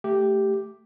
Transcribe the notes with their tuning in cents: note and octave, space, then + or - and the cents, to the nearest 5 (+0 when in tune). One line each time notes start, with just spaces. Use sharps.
A3 +0 G4 +0